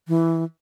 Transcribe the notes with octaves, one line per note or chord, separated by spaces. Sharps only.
E3